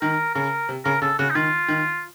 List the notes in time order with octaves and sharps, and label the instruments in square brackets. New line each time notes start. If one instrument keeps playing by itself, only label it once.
[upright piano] D#3 [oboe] A#4
[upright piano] C#3 [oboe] A#4
[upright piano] C3
[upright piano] C#3 [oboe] A#4
[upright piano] C#3 [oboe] A4
[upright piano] C#3 [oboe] F#4
[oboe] D#4
[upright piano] D#3 [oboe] F4
[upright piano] D#3